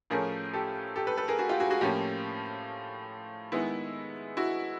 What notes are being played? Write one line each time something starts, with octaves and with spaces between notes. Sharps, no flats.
A2 F3 A3 C#4 G#4 A#4
G4 A4
G4 A4
A4 B4
A4 B4
G#4 A#4
F#4 G#4
F4 G4
F#4 G#4
F#4 G#4
A2 F3 A#3 C#4 F4 G4
D#3 G#3 B3 E4
E4 F#4